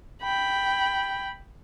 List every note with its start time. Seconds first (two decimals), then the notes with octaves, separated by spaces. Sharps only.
0.23 G5 B5